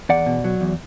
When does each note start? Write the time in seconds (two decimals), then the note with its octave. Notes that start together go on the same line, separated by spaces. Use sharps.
0.09 E2 D5 F#5
0.26 B2
0.44 F#3
0.61 E2